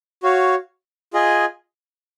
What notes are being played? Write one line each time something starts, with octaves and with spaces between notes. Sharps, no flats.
F#4 C#5 F5
F4 G#4 D#5 G#5